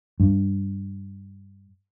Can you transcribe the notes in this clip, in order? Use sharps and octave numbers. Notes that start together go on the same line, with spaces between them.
G2